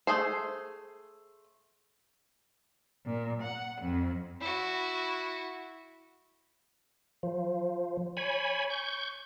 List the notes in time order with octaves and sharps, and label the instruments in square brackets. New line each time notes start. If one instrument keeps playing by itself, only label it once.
[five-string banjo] A3 G#4 C5
[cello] A#2
F#5
F2
[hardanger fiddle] E4 F#4
[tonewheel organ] F3
C#5 G#5 B5
C#6 G6